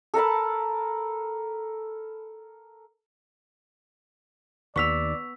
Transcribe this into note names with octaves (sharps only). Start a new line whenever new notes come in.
A4 A#4 A5 B5
D#2 B3 D5 C#6 E6 B6 F7